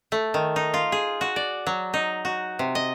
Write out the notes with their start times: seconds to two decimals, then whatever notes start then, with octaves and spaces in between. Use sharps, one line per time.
0.12 A3
0.34 D#3
0.56 D#4
0.74 F4
0.92 G#4
1.21 F#4
1.36 D5
1.67 F#3
1.94 D#4
2.25 F#4
2.59 C3
2.75 D#5